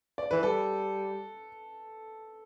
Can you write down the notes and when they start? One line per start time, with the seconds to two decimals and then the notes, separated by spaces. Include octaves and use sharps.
0.18 D5
0.31 E3 B4
0.43 G3 A4